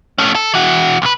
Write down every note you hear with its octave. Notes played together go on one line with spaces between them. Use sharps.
A3 C#4
A4
E3 F#4
B1 B4